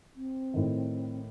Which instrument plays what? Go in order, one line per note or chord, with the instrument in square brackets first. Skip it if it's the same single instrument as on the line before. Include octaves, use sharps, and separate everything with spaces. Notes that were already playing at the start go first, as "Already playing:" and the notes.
[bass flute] C4
[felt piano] A2 D#3